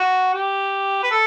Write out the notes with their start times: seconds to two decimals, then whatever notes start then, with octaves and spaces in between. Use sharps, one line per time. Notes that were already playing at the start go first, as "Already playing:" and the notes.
Already playing: F#4
0.33 G4
1.03 B4
1.11 A4